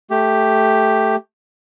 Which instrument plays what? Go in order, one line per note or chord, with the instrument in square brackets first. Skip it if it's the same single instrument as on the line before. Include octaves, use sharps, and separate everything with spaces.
[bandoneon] A3 G4